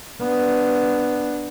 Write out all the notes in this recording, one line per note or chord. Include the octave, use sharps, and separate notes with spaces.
B3 D4